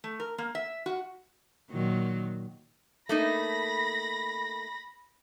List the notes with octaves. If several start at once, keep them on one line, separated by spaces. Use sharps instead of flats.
A3
A#4
A#3
E5
F#4
A#2 D#3 F#3
A3 A#3 D#4 B5 A#6